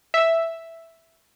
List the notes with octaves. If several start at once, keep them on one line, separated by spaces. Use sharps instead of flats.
E5